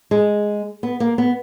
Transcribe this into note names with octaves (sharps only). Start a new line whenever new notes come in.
G#3
B3
A#3
B3